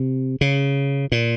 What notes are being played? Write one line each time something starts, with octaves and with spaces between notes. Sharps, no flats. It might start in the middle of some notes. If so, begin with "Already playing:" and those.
Already playing: C3
C#3
A#2